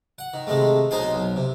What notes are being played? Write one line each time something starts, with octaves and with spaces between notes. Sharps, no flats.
F#5
D#3
C3 D#3 G#3 A3
B1 D#4 C5 G#5 A5 C6
B1
C3